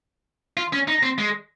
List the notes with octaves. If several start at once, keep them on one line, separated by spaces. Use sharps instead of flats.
F4
C#4
D#4
C4
G#3